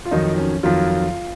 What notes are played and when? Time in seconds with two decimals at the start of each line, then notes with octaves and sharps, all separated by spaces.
0.05 F4
0.11 F2 D#3 F#3 D#4
0.38 C#4
0.63 F2 D#3 F#3 F4